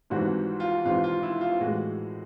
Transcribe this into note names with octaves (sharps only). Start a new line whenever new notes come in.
G#1 G#2 E3 G3 C4 F#4
F4
G#1 G#2 E3 G3 C4 F4
F4
E4
F4
A2 E3 G#3 F#4